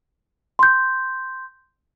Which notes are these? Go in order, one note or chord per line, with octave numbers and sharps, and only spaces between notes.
C6 G6